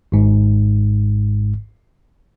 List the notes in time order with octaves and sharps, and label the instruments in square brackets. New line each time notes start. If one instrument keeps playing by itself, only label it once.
[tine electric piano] G#1 G#2